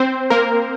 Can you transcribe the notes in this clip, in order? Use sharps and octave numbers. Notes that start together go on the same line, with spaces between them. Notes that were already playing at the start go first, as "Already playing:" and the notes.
Already playing: C4 C5
A#3 A#4